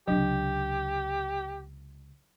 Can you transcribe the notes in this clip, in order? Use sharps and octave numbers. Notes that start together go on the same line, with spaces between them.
C#2 C3 F#3 D4 G4